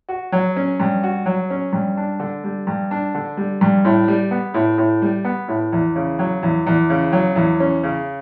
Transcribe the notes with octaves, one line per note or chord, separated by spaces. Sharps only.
F#4
F#3
C#4
G2
F#4
F#3
C#4
G2
D4
D3
G3
G2
D4
D3
G3
G2
A2
G3
B3
A2
A2
G3
B3
A2
E2
C#3
F#3
E2
E2
C#3
F#3
E2
C#4
C#3